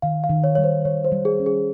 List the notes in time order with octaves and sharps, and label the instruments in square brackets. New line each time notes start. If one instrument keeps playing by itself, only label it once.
[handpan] D#3 [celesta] F5
[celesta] F5
[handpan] D#3
[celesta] C#5
[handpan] G3 [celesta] C#5
[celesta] C5
[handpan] D#3 [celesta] C#5
[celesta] C5
[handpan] G3
[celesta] G#4
[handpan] C#4
[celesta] G#4